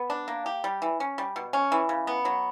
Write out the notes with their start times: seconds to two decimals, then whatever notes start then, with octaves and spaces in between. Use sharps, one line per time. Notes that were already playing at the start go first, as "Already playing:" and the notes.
Already playing: B3
0.10 D4
0.28 A#3
0.46 G4
0.64 G3
0.82 E3
1.00 C#4
1.18 G3
1.36 B2
1.53 C#4
1.72 E3
1.89 C#3
2.07 B3
2.25 F#3